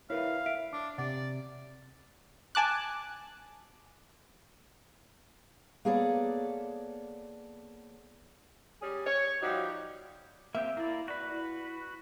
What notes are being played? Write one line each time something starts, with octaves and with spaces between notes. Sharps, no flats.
E4 A#4 B4 C#5 E5 F5
E5 D7
D4 D6
C3 D5 F#5
G#5 A5 D6 F#6
A#3 B3 G#4 A4 C#5 D5
G3 C#4 G#4
C#5
F3 G3 D#4 F#4
A#3 C4 G4 E5
A#3 E4 D5
F#4 B4 D5
E4